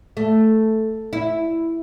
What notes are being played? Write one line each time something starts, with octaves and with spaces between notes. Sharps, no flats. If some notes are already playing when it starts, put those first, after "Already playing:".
A3
E4